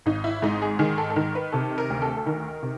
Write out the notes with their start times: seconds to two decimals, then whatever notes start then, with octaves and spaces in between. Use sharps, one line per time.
0.06 G#1 D#4
0.24 E4
0.42 G#2 D#4
0.62 G#4
0.79 D#3 G#4
0.98 A4
1.10 A4
1.16 D#3 A#4
1.35 B4
1.52 C3 A4
1.78 A#4
1.90 D2
2.02 A4
2.17 A4
2.26 D#3 A#4
2.63 C3